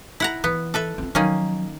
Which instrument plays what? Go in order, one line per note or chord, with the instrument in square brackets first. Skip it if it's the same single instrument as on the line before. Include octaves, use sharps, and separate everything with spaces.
[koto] E4 F#5 A#5
[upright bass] E3 [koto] B3
[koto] A4 B4 E5
[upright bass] C4 F4
[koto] D#3 A#3 C#4 [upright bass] F3 F#3